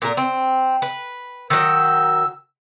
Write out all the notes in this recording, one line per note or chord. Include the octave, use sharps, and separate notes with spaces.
A#2 A#4
C4
B4
D#3 F#3 E6